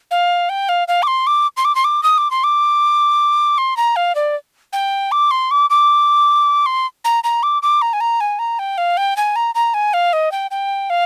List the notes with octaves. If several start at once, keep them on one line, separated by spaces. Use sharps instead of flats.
F5
G5
F5
F5
D6
C6
D6
C6
D6
C6
D6
D#6
D6
C6
D6
C6
A#5
F5
D5
G5
D6
C6
D6
D6
C6
A#5
A#5
D6
D6
A#5
G#5
A#5
G#5
A#5
G5
F5
G5
G#5
A#5
A#5
G#5
F5
D#5
G5
G5
F5